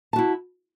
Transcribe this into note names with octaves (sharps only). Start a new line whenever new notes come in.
E4 F#4 A5